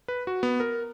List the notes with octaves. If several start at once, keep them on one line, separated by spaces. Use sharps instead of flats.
B4
F#4
B3
A#4